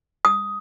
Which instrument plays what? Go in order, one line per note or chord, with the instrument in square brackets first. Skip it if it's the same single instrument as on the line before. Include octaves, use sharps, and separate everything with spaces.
[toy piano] D#6